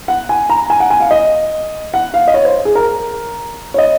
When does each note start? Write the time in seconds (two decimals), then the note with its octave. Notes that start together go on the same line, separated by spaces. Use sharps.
0.08 F#5
0.29 G#5
0.50 A#5
0.70 G#5
0.80 F#5
0.90 G#5
1.00 F5
1.11 D#5
1.94 F#5
2.14 F5
2.28 D#5
2.34 C#5
2.45 C5
2.65 G#4
2.75 A#4
3.74 C#5
3.78 D#5